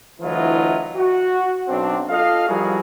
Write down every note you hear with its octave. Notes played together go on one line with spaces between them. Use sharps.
D2 E3 F#3 E4 F4 D#5
F#4
B1 C4 D4
F4 A4 D#5 F5
F3 G3 E4 F#4 G#4 A#4